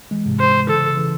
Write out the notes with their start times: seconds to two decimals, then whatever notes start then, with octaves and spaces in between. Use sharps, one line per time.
0.11 E3 G#3
0.26 G#2 C3
0.40 C5
0.69 C#3 E3 A4
0.97 C#3 E3